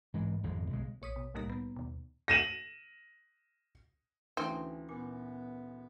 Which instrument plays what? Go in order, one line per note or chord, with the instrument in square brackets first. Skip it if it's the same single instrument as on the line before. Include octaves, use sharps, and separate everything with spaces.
[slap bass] G#2 E3 G#3
G#1 F2 D3 G#3
B1 G#3
[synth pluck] A#1 C#5 D#6 B6
B2
C2 A2 G3 A#3 D#4 A#5
B3
D#2 B2
[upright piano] A#6 D#7 E7 F#7
[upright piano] D2 E3 [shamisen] C4 [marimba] C#4 D#4 A5
[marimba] A#2 G#5 [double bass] B3